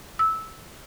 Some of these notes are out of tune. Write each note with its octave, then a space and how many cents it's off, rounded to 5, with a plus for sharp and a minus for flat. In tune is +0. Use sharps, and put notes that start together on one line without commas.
E6 -15